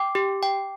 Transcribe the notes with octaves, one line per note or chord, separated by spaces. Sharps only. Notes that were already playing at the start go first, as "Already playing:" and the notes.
Already playing: G5 D6
G4
G5